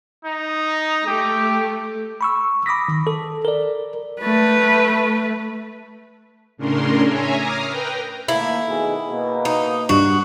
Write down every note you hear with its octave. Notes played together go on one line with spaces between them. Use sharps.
D#4
A3 G4
B5 C#6 E6
B5 D6 D#6 A#6 B6
D#3
A4
A#4 D5
A3 B4
A2 C#3 C#4 D4 A#4 C6
C#5 E5 G#5 A#5
A#5 D6 D#6 F6 A#6 C7
A#4 B4 G5 A#5
D#3 A3 A#3 E4
B2 D#3 G#4
B2 A#3
D#4
G2 G3 D4 F#4